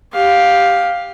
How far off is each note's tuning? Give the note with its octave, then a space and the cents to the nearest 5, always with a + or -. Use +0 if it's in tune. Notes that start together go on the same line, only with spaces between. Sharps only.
G4 +0 F5 +10